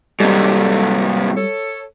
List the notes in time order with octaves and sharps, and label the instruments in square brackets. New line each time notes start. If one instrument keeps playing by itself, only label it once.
[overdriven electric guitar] G#2 C3 [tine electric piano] G3 [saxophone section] D4 G4 A4
[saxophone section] A4 C#5